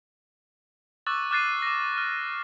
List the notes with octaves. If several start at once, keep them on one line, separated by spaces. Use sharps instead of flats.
C#6 D6 E6 F#6 A6
D6 F6 F#6 A6 C7 D#7
D6 A#6
F6